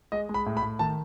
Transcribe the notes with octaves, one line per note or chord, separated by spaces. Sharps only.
G#3 D#5
G#3
B5
A2
B5
A2
D#3 A5